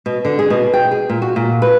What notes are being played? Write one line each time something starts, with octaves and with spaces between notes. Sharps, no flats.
B2
D3
G#4
B2
G5
G#4
A#2
F#4
A#2
B4